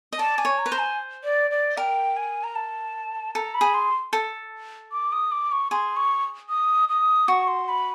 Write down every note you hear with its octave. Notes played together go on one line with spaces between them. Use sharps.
D#5
D5 A5
D5 G#5
C#5
A#5
B4
C5
G#5
D5
D5
A#4 G5
G#5
A#5
A5
A4 A#5
B5
G#4
C6
A4
D6
D#6
D6
C#6
G#4 C6
C#6
D#6
D#6
F#4 C#6
C6
B5